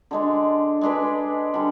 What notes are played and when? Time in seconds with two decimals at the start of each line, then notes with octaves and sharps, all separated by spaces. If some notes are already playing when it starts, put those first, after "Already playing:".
0.11 D3 G#3 D4
0.81 G#3 D4 G#4 B4
1.54 D3 G3